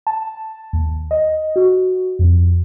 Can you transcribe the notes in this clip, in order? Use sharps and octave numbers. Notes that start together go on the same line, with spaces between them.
A5
D#2
D#5
F#4
F2